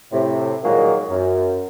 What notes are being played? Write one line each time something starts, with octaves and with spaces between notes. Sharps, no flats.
A2 C3
A#2 D#3 F3 F#3 G#3 A#3
F#2